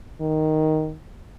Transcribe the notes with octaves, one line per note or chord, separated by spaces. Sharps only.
D#3